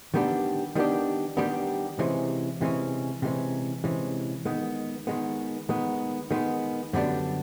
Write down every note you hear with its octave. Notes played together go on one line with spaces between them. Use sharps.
D#3 G3 B3 D4 G4
D#3 G3 B3 D4 G4
D#3 G3 B3 D4 G4
C3 E3 G#3 C#4
C3 E3 G#3 C#4
C3 E3 G#3 C#4
C3 E3 G#3 C#4
D#3 G#3 B3
D#3 G#3 B3
D#3 G#3 B3
D#3 G#3 B3
F#2 D3 G3 B3 D4